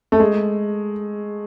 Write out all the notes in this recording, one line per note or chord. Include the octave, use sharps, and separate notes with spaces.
A3
G#3